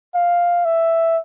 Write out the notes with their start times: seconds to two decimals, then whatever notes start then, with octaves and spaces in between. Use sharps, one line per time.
0.15 F5
0.65 E5